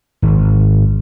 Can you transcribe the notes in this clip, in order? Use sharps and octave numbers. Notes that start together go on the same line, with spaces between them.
G#1